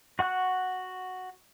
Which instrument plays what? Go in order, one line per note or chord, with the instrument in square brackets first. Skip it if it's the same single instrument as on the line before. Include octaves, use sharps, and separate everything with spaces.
[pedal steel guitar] F#4 F#5 C#6 F#6